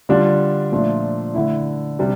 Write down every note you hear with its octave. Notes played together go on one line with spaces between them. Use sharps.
D3 G3 D4 F4
A#2 F3 A3 D4 F4
D3 A3 E4
C3 G3 D4